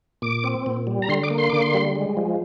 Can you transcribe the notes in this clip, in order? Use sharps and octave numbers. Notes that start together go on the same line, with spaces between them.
A#2 D6
C4
A#2
G3
A#5
D3 C6
D6
A#3
C6
D3 D6
C6
G3
G#3
F3